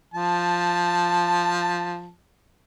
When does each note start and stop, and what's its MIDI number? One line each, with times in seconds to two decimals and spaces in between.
0.14 2.10 53
0.14 2.10 81